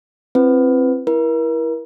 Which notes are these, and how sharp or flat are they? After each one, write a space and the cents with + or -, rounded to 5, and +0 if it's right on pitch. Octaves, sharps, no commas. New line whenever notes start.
C4 +15 E4 +45 B4 +15
E4 +0 A#4 +35